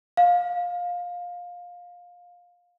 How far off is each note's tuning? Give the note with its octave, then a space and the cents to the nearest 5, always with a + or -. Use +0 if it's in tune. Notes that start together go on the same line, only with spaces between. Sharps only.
F5 +20